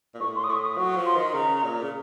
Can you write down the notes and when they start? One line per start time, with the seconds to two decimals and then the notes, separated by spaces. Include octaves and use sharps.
0.15 A#2
0.21 A2 C#6
0.36 C6
0.44 D#6
0.49 A2 C#6
0.63 D#6
0.78 F#3 C#6
0.97 F3
1.06 C6
1.16 D#3
1.34 C#3 A#5
1.63 A#2
1.82 C#3